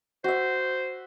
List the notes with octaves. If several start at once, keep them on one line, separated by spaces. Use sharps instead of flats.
F#4 C5 E5